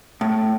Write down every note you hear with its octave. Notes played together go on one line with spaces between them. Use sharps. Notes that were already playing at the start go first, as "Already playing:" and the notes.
A2